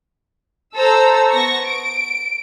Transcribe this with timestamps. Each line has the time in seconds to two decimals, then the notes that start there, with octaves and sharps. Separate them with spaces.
0.75 A4 C5 A#5 E6
1.33 B3 C#6 A#6
1.65 D7